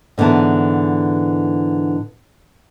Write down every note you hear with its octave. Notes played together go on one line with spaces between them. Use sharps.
G#2 D3 E3 B3 A5